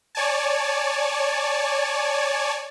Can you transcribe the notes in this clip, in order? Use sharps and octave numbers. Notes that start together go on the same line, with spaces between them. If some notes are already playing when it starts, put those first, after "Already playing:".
C#5 D5 G#5 A5